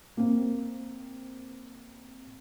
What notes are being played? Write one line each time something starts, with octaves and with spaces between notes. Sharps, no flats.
A#3 C4